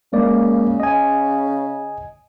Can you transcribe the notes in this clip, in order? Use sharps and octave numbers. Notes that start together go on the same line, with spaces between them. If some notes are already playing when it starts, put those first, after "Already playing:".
C#3 G#3 A#3 D5
D#5 G#5